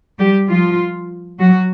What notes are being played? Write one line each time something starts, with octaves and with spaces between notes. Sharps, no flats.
G3 G4
F3 F4
F#3 F#4